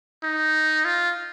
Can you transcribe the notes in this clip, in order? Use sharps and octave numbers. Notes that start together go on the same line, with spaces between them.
D#4
F4